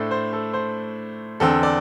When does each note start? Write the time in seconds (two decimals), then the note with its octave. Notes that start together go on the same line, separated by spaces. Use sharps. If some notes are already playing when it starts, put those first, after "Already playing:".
Already playing: A2 A3 D4 A4 C5
0.11 C5
0.33 A4
0.53 C5
1.40 E2 D3 C4 A4
1.63 D5